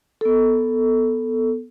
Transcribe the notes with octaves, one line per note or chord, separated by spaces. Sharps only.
B3 A4